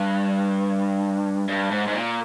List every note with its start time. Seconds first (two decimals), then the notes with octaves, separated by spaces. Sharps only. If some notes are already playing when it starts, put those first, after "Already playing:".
Already playing: G2
1.48 G2
1.71 G#2
1.88 G#2
1.95 A#2